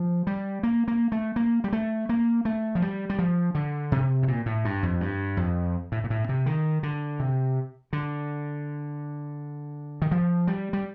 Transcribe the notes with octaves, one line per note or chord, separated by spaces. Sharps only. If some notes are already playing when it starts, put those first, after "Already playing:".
Already playing: F3
G3
A#3
A#3
A3
A#3
G3
A3
A#3
A3
F3
G3
G3
F3
D3
C3
A2
A#2
A2
G2
F2
G2
F2
A2
A#2
A2
C3
D#3
D3
C3
D3
D#3
F3
G3
G3